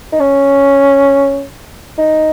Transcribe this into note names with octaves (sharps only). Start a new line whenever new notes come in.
D#4
C#4
D#4